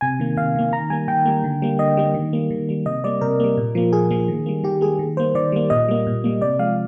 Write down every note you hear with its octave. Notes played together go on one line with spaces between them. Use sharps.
C3 G#5
D#3 A#3
C3 F5
D#3 A#3
D#3 A#5
G3 A#3 G#5
D#3 G5
G3 A#3
D3
G3 A#3
D3 D#5
G3 A#3
D#3
G3 A#3
D#3
G3 A#3
C3 D#5
G3 A#3 D5
C3 A#4
G3 A#3
A#2
F3 A#3
A#2 G#4
F3 A#3
D#3
G3 A#3
D#3 G4
G3 A#3 G#4
D#3
G3 A#3 C5
D#3 D5
G3 A#3
A#2 D#5
G3 A#3
A#2
G3 A#3
C3 D5
F3 G#3 F5